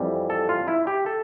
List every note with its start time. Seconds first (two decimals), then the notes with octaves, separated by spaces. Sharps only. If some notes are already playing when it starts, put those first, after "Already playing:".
Already playing: F2 E3 G3
0.30 A4
0.49 F4
0.68 E4
0.87 G4
1.06 A4